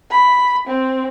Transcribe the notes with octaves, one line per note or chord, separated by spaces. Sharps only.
B5
C4